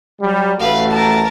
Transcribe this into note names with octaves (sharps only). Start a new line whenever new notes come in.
F#3 G3
A1 A3 F#4 B4 F5
A#4 A5